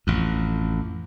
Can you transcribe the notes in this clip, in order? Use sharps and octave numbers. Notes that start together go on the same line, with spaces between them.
A1 F2